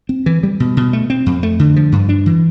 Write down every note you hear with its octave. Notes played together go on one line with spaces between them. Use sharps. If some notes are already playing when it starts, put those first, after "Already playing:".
C4
E3
G3
B2
B2
A3
C4
F2
A3
D3
F3
G2
D4
E3